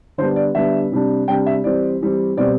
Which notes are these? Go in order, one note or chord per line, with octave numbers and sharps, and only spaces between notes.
D3 G3 B3 D4 C5
D5
D3 G3 B3 D4 E5
C3 G3 D4
C3 G3 D4 G5
E5
E3 G3 C4 D5
E3 G3 C4
B2 G3 C4 D5